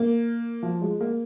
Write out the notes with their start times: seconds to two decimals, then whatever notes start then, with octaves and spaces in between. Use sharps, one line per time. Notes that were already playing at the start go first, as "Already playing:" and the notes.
Already playing: A#3
0.63 F3
0.82 G#3
1.01 A#3